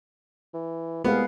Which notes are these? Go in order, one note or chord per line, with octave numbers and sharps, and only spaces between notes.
E3
C2 G#3 B3 G#4 F5